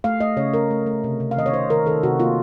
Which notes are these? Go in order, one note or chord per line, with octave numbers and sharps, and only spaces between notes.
A3 F5
A3 D#5
C#3 C#5
A3 A#4
A3
A3
C3
C3
F5
D#3 D#5
C#5
C3 C5
D#3 A#4
D#3 A4
C3 F#4
A#3 F4